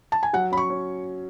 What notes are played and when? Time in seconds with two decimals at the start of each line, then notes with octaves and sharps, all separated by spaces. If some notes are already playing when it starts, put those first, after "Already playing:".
0.12 A5
0.23 G#5
0.33 F#3 F#5
0.51 C#4 B5
0.57 C#6
0.70 C#4